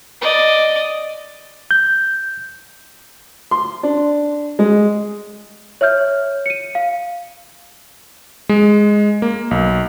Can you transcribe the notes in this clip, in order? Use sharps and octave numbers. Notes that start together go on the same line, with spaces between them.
D5 D#5
G6
C6
D4
G#3
C#5 E5 F6 G6
C#7 D#7
F5
G#3
A#3
B1